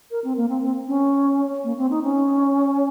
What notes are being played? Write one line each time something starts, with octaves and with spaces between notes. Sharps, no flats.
A#4
C4
A#3
C4
C4
C#4
A#3
C4
D#4
C#4